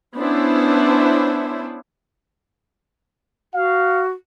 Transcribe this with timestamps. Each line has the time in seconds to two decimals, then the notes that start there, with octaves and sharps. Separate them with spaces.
0.16 B3 C#4 D4 E4 C5
3.54 F#4 F5